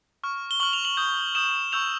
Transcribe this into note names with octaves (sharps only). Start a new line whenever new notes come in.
C#6 F6
G7
C#6 F6 F#7
F7
F#7
D#6 G6
D#6 G6 E7
C#6 E6 G6 F7